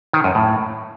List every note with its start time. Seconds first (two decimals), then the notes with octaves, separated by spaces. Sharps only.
0.13 D#3
0.24 F#2
0.35 A2